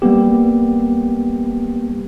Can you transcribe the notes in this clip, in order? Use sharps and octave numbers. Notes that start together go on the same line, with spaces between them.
G3 A#3 B3 G4